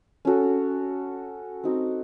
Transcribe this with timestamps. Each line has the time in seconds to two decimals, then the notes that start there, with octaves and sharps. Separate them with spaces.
0.25 C#4 F#4 A4
1.64 C4 D#4 F#4